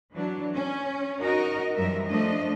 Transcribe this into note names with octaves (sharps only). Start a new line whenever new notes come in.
E3 F#3 D4
C#4
D#4 F#4 A#4 D#5
F#2 E3 F3 G3 A#4 E5
F3 A3 D4 D#5